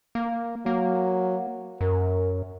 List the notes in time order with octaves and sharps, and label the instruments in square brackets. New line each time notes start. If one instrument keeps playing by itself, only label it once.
[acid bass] A#3
[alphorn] F#3 [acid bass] A#3
[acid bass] F#2 [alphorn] A#4